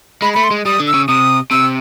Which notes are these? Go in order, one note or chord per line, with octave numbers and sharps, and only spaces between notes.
G#3 B5
B5
A3
C6
G#3
G3 D#6
D3
E6
C#3
C3 D#6
C3 E6